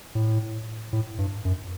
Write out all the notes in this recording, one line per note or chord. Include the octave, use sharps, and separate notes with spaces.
A2
A2
G2
F#2